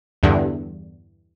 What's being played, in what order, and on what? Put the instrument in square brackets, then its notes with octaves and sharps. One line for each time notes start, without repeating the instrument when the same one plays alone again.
[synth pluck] E2 G2 D3